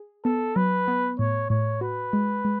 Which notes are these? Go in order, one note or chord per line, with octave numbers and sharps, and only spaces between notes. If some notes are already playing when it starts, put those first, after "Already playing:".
Already playing: G#4
B3 A4
F#3 B4
B3
A2 C#5
A2 C#5
F#4 B4
G#3
G#3